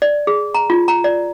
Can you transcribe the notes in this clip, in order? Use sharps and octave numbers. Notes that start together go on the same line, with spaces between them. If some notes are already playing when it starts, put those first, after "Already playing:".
D5
G#4
A#5
F4
A#5
D5